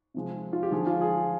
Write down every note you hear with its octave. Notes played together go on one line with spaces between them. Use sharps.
C3 F3 G#3
F4
G4
D3 F3 G#3 G#4
F4
G#4